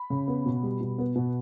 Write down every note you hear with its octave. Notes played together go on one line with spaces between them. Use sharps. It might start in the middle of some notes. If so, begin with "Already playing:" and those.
Already playing: B5
C#3
B3
B2
G3
B2
B3
B2